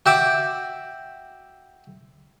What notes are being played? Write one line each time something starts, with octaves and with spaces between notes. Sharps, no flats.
F#4 E5 G5 D6 G6